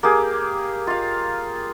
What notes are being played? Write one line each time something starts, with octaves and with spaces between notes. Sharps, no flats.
A#3 G4 G#4
F4 F5